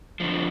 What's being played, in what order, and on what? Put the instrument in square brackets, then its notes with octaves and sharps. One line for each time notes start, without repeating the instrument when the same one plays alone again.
[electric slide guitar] F#2 D3 F3